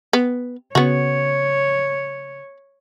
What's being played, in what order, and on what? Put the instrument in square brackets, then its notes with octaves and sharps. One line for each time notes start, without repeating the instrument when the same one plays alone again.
[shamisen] B3
[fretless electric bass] C#3 [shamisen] B3 F#4 [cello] C#5